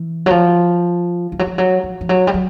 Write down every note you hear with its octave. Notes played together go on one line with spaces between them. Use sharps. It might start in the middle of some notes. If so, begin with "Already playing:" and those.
Already playing: E3
F#3
F3
F3
F#3
F3
F#3
F3
F3
F#3
G3
F#3